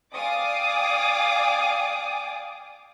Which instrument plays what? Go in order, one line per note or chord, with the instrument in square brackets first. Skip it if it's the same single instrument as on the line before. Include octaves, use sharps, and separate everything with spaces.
[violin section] D5 F5 G5 G#5 D6 D#6